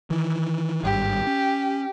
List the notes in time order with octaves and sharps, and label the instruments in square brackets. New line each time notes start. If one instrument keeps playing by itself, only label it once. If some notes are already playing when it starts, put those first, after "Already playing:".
[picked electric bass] D#3 E3
[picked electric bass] G#1 G2 [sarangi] G4
[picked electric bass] C#4